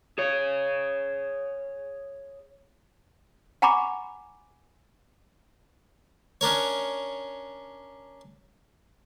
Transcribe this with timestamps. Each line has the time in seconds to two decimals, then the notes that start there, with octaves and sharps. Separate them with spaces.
0.18 G#4 C#5
3.62 F#5 G#5 A#5 B5 C#6 D6
6.41 C#4 D4 A#4 C#5